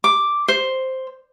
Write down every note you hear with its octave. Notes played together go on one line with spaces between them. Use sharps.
D6
C5